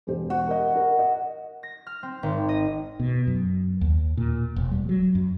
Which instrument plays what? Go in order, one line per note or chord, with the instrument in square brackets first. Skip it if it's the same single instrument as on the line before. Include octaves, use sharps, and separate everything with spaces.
[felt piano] E1 G4 C5
[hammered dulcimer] F#4
[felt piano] A#4 D#5
A#4
D#5
[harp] A#6
F6
C4
G#1
D#5
[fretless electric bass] B2
F#2
D#2
A#2
E1
G3
F#3
F#2